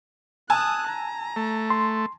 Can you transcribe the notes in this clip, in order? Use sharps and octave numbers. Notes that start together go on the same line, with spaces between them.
G#5 A5 D#6 E6 F#6
A#5
A3
C6